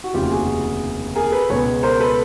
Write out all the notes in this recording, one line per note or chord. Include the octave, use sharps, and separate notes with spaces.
F#4
F1 D#2 C#3 F4 G4
F#4 G#4
G#4 A#4
A4 B4
C#2 B2 G#3 B4 C#5
A#4 C5
A4 B4